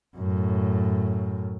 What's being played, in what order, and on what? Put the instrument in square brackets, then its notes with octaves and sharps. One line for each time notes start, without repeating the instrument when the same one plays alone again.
[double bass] F#2 A2